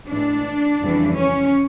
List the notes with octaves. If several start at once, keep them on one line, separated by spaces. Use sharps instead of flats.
A2 E3 G#3 D4
F2 C#3 E3 G3
C#4